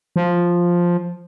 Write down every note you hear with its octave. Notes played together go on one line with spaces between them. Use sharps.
F3